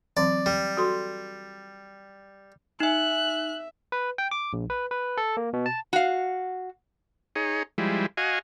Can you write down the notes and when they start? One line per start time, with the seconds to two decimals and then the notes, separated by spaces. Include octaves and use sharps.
0.17 E3 F#3 C4 D5
0.46 G3
0.77 F#4 A4 C6
2.80 D#4 E5 G#5 F#6
3.92 B4
4.18 G5
4.31 D6
4.53 A#1
4.70 B4
4.91 B4
5.17 A4
5.37 A#3
5.53 B2
5.66 A5
5.93 F#4 F5
7.36 D#4 G#4 C#5
7.78 F3 G3 G#3 E4
8.17 F#4 D#5 F5 G#5